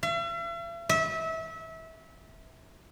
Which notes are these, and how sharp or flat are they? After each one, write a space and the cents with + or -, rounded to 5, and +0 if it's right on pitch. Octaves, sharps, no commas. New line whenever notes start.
E5 +45
E5 -25